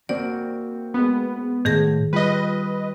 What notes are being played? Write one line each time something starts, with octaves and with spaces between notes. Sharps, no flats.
A#3 C4 F#4 D5
G#3 B3
A2 D#3 G#4 A#6
G3 F4 B4 D#5